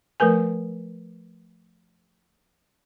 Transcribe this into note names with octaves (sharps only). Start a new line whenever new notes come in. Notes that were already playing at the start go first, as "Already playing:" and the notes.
F3 A3 A#4 B4 G#5